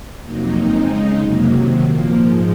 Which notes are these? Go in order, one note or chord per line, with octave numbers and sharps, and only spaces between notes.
F2 C3 F#3 A#3 D#4
C#3 G#3 C4 D#4
C#3 G#3 D#4
F2 C3 F#3 A#3
C3 D#3 F#3
A#2 F3 A#3
G#2 F3 G#3